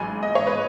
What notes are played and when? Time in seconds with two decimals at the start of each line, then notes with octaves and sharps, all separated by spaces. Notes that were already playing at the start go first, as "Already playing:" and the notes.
Already playing: A1 G#2 F#3 G#5
0.23 D#5
0.35 C#5
0.47 B4